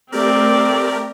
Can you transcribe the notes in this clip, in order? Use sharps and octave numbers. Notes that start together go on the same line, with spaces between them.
A3 C4 G4 A#4 D5